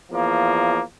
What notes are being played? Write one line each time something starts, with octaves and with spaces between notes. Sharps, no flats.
E2 F3 A#3